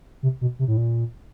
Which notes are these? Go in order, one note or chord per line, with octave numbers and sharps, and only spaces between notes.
C3
B2
C3
A2
A#2